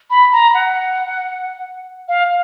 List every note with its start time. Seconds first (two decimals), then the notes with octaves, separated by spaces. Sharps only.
0.10 B5
0.32 A#5
0.54 F#5
2.08 F5